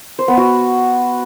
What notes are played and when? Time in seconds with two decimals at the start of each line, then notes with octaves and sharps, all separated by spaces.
0.19 C5
0.28 B3
0.37 F#4